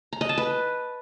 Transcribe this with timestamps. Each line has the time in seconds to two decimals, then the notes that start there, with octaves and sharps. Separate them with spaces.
0.13 A#5
0.21 D#5
0.29 A5
0.38 B4